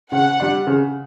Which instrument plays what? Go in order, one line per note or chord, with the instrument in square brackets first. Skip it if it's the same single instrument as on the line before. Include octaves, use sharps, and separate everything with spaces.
[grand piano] C#3 [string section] F#5
[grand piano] G3 D4
C#3